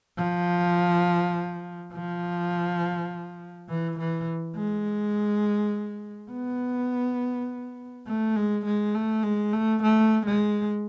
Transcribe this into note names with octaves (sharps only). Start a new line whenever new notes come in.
F3
F3
E3
E3
G#3
B3
A3
G#3
G#3
A3
G#3
A3
A3
G#3